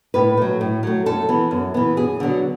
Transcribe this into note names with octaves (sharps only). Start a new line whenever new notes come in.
A2 B4
F#3 A3
A2
F#3 A3
F#2 A4
E3 B3
F#2
E3 B3
F#2 G#4
D3 F#3 B3